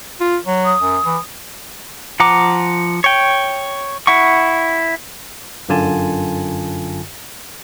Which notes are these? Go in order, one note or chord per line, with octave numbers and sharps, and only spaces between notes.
F4
F#3
D#6
F#2
E3
F3 F#5 A#5 D6
C#5 G5
E4 F#5 C#6
G1 F#2 D3 F4 G#5 A5